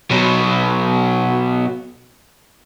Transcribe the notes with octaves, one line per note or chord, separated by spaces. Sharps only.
B2 F#3